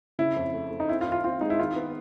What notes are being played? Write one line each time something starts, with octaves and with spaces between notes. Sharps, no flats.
C#3 E4
F2
A3
A3
D#4
C4 E4
F4
D#3
F4
C4 F4
G#3 D#4
E4
D#3 F4
B3